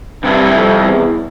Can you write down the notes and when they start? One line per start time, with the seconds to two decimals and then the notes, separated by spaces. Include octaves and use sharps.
0.24 G2 C3 G3 C4 E4
0.53 F2
0.84 E2